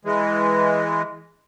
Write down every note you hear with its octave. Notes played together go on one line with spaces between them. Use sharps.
E3 G#3